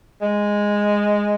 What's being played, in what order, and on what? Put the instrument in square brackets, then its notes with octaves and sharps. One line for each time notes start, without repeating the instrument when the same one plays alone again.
[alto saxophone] G#3